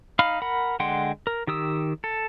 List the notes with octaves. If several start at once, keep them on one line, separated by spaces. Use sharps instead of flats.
D#4 F5 B5 F6
A#4 F#5 B5
D3 G#3 F#5 G5 C6
A#4
D#3 G4 D#6 E6
A4